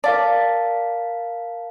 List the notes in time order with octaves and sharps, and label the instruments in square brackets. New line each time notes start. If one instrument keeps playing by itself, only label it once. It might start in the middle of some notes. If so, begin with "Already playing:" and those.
[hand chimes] A#4 F5 A5 [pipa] D5